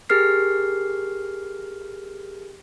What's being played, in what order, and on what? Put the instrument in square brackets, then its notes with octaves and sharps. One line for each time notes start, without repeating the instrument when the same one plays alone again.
[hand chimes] G4 G#4 A#4 F6 C7